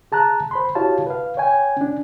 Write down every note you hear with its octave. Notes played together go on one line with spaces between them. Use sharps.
G#4 A5 A#5 F#6
C5 B5 C6
E4 F#4 G4 C#5 F5 A5
B4 F5
C#5 G5 G#5
C#4 D4